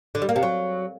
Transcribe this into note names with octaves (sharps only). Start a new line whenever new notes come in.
D3
G3
A#3
C3
F#3